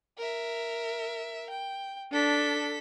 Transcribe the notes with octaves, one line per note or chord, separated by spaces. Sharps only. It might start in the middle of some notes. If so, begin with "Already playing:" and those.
A#4 E5
G5
D4 A4 B6